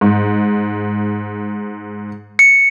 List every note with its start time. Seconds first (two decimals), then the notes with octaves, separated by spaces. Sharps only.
0.01 G#2
2.39 C#7